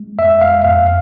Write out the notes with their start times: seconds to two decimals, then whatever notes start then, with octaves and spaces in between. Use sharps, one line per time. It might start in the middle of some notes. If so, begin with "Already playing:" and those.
Already playing: G#3
0.18 F2 E5
0.41 F5
0.64 F2 F5